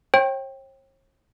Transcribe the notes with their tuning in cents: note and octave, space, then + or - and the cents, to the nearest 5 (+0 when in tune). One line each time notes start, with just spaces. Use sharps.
C#5 -45 G5 +0